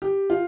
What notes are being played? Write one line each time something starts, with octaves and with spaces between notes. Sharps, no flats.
G4
F4